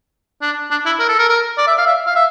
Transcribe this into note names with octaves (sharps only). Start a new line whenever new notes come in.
D4
D4
E4
A#4
A4
A#4
A#4
D5
E5
F5
E5
F5
E5